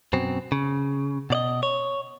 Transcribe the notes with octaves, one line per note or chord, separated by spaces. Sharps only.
F#2 B2 C4
C#3
B2 D5 D#5
C#5